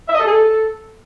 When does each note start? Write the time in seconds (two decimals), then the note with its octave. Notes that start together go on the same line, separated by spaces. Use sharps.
0.08 E5
0.14 D#5
0.20 A4
0.25 G#4
0.31 A4